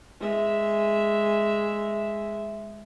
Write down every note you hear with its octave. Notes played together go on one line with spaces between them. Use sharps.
G#3 E5